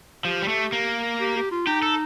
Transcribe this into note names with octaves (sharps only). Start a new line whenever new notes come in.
F3 G4
G3
A3
A#3
G4
G4
F4
D#4 G4
A4